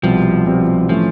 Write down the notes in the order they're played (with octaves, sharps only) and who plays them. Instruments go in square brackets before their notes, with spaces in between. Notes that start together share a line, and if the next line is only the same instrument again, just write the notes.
[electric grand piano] C2 B2 G3 C4 [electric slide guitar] F3
[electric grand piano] C2 B2 G3 C4
[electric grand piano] A2 E3 A3 C#4 [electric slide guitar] F3